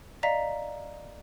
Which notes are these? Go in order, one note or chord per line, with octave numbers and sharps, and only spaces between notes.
D5 D#5 F5 A#5 B6